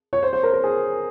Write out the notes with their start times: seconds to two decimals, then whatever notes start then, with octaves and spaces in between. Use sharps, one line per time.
0.13 C#5
0.23 C5
0.33 C5
0.43 A#4
0.53 A#4
0.64 G#4